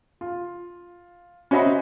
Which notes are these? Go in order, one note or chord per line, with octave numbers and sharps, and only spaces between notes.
F4
C#4 F#4 C5 D#5 E5 B5